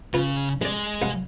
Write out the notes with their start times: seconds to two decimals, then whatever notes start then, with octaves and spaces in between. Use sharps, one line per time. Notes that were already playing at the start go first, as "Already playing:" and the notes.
0.14 C#3 F4 B4 B5
0.61 A1 G#3 D5
1.02 C2 F5 F#5